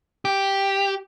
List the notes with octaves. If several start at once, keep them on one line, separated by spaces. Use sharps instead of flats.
G4